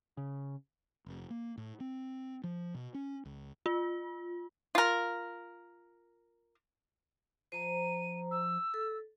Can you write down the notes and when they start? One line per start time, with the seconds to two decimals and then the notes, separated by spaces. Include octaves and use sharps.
0.17 C#3
1.06 F1
1.30 A#3
1.57 A2
1.80 C4
2.44 F3
2.74 B2
2.94 C#4
3.25 C#2
3.66 F4
4.75 F4 A#4
7.52 F3 C5 A#5 D#7
8.31 E6
8.74 A4